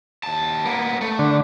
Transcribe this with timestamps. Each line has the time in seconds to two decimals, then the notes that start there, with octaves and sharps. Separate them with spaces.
0.23 D#2 A5
0.65 A#3 B3
1.01 A3
1.19 D3